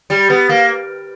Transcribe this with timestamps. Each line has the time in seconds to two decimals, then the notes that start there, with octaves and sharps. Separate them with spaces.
0.10 G3
0.30 B3
0.49 A#3